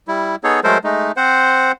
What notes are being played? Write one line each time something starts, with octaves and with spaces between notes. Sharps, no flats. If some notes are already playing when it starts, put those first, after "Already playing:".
G3 E4
B3 D#4 G#4 A4 C#5
F#3 G#3 A3 A4 A#4 C5
G#3 A3 D#4
C4 C5 F#5